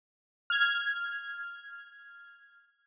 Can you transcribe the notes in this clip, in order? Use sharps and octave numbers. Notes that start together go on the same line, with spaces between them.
F6 G#6